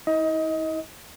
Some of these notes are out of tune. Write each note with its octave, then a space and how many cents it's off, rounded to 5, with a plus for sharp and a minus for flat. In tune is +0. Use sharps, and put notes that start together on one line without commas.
E4 -45 D#5 +25